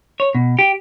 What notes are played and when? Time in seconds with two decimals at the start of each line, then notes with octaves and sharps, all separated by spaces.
0.20 C#5
0.35 B2
0.59 G4